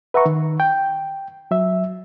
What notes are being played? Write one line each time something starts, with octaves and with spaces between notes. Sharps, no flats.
B4 E5 F#5 A#5 C#6
D#3
G5
F#3 E5